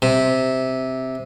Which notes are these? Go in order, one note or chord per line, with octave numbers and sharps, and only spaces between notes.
C3